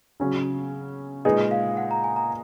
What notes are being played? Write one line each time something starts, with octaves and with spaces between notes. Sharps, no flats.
C#3 F#3 C#4
A#2 G#3 D#4 G#4 B4 D#5
F5
F#5
A#5
G#5
A#5